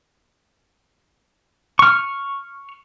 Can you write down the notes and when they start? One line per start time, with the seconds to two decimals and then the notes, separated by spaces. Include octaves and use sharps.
1.79 C#6 F6